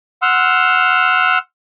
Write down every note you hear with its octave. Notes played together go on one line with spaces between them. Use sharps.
F#5 C6 E6 F6